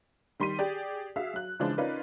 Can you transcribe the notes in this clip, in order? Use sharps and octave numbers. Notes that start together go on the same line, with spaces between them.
D#3 G3 C6 B6 D#7
G4 G#4 D5
F#4 G#4 E5 F5
F#3 F#6
C#3 E3 F3 G#3 D4
C#4 D#4 F4 A#4 B4 D5